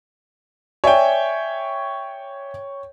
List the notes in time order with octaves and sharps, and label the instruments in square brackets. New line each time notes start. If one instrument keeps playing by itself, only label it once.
[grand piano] C#5 G5 [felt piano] D5 E5 G#5